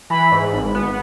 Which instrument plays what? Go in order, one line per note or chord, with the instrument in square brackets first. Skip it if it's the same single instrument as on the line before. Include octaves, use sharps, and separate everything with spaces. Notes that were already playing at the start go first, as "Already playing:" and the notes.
[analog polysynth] E3 [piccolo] B5
[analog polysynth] G#2
G#1
B3